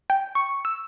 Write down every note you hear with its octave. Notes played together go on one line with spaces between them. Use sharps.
G5
C#6
E6